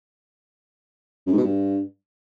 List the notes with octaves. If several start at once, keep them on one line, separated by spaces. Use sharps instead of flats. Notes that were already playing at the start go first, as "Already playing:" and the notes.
F#2
G#2
B2
G2